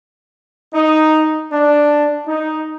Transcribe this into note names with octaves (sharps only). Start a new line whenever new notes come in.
D#4
D4
D#4